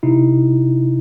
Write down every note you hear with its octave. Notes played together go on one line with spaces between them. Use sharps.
C3 D#4 E4